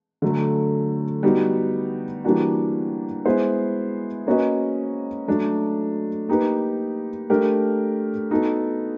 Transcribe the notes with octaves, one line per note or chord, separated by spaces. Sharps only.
D3 F#3 A3
G3 B3 D#4 F#4
E3 G3 A#3 D4 F#4
G#3 B3 E4 G#4 C5
A#3 C#4 F#4 B4 D#5
F#3 A3 D4
A#3 D#4 G4 B4
A3 D4 G4 A#4
B3 D#4 F#4 A4